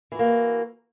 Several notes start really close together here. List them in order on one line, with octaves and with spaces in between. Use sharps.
E3 F#4 A#3